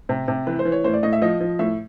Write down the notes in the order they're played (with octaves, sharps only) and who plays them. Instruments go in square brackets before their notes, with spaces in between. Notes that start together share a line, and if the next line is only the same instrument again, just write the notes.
[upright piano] C3
C3
E3 B4
C5
E3
C#5
A2 C5
D5
A2 D#5
E5
F3 D#5
F3
A2 E5